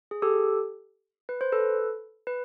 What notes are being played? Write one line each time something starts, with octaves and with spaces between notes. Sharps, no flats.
G#4
G4 A4
B4
C5
A4 B4
B4